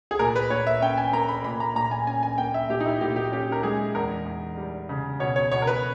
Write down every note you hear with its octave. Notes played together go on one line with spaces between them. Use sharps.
G#4
A#2 A#4
B4
A#2 C#5
E5
C#4 G5
G#5
A#3 A#5
B5
A#2 B5
A#5
A#2 A#5
G#5
C#4 G#5
G#5
A#3 G5
E5
A#2 G4
D#4
E4
A#2 G4
G4
C#4 G4
A#4
G#3 G#4
E2 A#4
E2
G3
C#3
B2 C#5
C#5
B2 C#5
A#4
B4